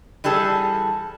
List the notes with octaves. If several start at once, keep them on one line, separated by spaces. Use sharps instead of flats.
E3 G3 G#4 A4